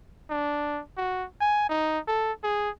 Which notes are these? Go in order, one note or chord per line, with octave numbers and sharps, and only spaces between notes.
D4
F#4
G#5
D#4
A4
G#4